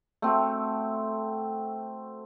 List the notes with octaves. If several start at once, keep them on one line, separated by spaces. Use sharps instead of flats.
A3 C4 F#4